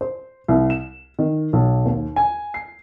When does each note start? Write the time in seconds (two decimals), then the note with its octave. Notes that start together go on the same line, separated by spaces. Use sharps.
0.01 C5
0.48 C2
0.70 E7
1.19 D#3
1.53 B1
1.86 D#2
2.16 G#5
2.54 C7